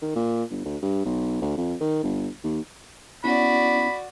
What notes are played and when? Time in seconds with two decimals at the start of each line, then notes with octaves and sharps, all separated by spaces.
0.02 D#3
0.15 A#2
0.51 G1
0.65 D2
0.82 G2
1.05 B1
1.41 D2
1.57 F2
1.80 D#3
2.03 G1
2.44 D#2
3.24 B3 C#4 E4 F#4 D5 B5